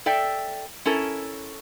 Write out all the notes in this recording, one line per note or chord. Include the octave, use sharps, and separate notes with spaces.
A4 D5 E5 G5
C#4 E4 A4 A#4